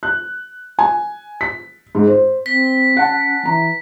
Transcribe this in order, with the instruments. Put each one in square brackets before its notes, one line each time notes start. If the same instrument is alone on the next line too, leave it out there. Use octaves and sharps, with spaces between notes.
[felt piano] F#6
G#5
B6
G#2
C5
[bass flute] C4 [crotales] B6
[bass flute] C#4 [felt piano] F#5 A5
[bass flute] E3 [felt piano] A#5